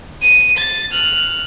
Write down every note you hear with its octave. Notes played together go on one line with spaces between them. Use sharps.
D#7
A6
F6 F#6